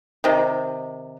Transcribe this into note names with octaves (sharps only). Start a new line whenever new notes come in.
C3 D#3